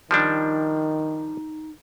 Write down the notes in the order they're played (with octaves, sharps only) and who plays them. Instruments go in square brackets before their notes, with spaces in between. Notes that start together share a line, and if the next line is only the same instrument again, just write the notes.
[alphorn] D#3 [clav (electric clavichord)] F3 G3 D4 [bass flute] D#4